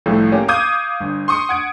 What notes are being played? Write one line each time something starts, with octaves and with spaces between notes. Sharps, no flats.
C2 A2 F3 A3
A#3 C#4 G4
F5 D6 D#6 G6 G#6 D#7
G1
C6 C#6 D#6 C#7
F#5 G#6 D7